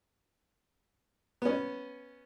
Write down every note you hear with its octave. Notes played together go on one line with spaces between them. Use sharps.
B3 C#4